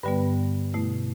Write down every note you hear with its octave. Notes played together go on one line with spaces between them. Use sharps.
G2 D3 G3 B3 B4
B2 A3 E4